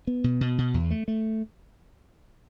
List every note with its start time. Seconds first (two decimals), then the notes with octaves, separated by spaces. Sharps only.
0.07 B3
0.24 B2
0.41 B2
0.58 B2
0.74 E2
0.91 A3
1.08 A3